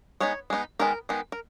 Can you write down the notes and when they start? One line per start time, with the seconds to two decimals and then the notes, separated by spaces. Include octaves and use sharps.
0.20 G#3 B3 D#4 C#5
0.50 G#3 B3 D#4
0.79 D#3 G#3 B3 D#4 A#4
1.09 D#3 G#3 B3 D#4
1.32 A#4